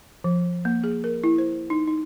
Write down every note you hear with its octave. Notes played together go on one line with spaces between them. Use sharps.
F3
A#3
G#4
A#4
E4
C5
D#4
D#4